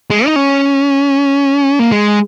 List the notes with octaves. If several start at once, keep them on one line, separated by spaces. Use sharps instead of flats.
G#3
D#4
C#4
A#3
G#3